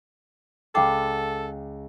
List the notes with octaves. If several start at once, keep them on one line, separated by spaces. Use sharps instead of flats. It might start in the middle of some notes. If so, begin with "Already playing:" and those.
C#2 A4 F5 G5 D6 C7